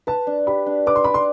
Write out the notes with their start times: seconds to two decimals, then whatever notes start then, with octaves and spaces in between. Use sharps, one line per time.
0.07 B4 A5
0.27 D4
0.47 G4 B5
0.66 D4
0.86 B4 D6
0.96 C6
1.04 D4 B5
1.14 C6